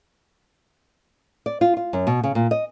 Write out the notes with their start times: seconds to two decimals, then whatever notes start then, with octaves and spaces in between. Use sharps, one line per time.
1.46 D5
1.61 F4
1.77 F4
1.93 F#2
2.07 B2
2.24 C#3
2.35 A#2
2.51 D#5